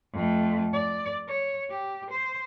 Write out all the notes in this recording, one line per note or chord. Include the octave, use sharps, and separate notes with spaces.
F2 A3
D5
C#5
G4
C5